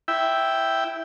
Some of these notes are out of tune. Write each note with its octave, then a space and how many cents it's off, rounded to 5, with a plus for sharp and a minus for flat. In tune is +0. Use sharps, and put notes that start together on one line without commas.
E4 +0 E5 +0 G5 +0